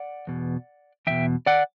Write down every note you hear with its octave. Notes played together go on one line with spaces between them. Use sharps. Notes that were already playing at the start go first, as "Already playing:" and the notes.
Already playing: D5 F#5
E2 B2
E2 B2 E5 G5
D5 F#5